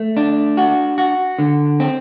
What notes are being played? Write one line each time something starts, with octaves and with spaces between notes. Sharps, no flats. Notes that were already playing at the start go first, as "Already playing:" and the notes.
Already playing: A3
D4
F#4
F#4
D3
C4